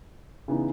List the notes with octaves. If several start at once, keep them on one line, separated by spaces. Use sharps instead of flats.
C#3 E3 B3 D#4